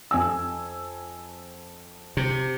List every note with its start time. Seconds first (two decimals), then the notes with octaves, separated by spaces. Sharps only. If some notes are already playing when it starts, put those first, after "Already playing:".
0.11 F2 G#5 E6
2.17 C3